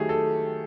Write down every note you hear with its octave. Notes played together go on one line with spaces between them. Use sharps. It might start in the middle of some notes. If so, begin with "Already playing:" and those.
Already playing: D#3 F#3 A3 G4 G#4
A4